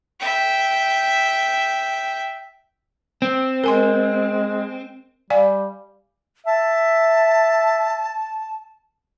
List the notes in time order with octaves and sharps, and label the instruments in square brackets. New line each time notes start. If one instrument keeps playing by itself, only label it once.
[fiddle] E5 G5
[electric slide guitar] C4
[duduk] G#3 [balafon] A#4 G#5 C6
[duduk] G3 [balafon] D5 F5 G#5
[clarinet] E5 [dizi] A5